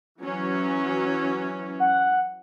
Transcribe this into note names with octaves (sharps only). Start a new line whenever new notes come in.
E3 F#3 C#4
F#5